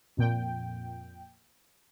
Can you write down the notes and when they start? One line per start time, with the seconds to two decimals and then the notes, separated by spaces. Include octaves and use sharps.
0.17 F2 A#2 G5